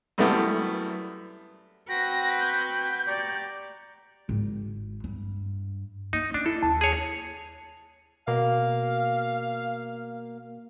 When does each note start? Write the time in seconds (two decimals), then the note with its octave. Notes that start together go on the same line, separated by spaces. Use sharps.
0.18 F#2 G3 A3 B3 E4
1.89 C4 F#4 B4 G5 A#6
2.40 G6
3.08 G4 D5 A#5 C#6
4.29 G#1
5.04 G2
6.13 A#3 D#4
6.34 C#4 D4
6.46 E4 A4
6.63 D#2 A5
6.81 G#4 C#5
8.28 B2 A#3 F5